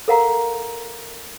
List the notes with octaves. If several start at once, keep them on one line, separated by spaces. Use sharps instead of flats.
A4 A#4 F5 F#5 A#5